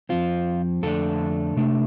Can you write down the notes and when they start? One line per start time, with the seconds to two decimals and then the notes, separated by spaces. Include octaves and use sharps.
0.09 F2 F3 C4 F4
0.83 F2 D3 A3 D4 A4
1.56 C3 A3 D4